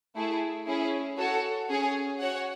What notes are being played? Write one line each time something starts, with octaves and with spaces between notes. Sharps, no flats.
A3 E4 G#4
C#4 E4 G#4
F#4 A4 C#5
C#4 G#4 C#5
F#4 C#5 F#5